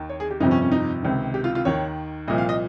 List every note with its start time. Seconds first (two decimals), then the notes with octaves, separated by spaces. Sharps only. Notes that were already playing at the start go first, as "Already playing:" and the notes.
Already playing: D#2 D#3
0.09 C#5
0.20 G#4
0.31 G4
0.40 G1 F2 C3 F3 D#4
0.51 C#4
0.62 C#4
0.72 D#4
1.03 C#2 C3 D#3
1.34 G4
1.44 F4
1.55 F4
1.65 D#2 D#3 C#5
2.28 C2 A#2 F3 D#5
2.38 F5
2.49 D#5